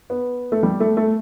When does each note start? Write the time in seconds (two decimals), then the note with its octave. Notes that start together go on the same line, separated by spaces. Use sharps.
0.10 B3
0.52 A3
0.63 G3
0.80 A3
0.97 A3